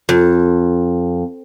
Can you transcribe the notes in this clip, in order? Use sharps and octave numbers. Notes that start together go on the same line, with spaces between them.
F2